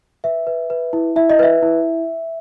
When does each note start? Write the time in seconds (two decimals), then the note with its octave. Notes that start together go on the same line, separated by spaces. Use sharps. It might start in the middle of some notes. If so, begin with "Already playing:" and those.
0.24 B4 E5
0.47 B4
0.70 B4
0.93 E4
1.16 E4 E5
1.30 D#5
1.39 B4 E5
1.62 E4